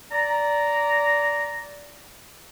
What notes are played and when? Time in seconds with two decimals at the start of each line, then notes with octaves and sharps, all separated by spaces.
0.12 D5 A#5